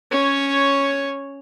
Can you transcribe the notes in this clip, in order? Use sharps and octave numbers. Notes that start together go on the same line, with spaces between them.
C#4 C#5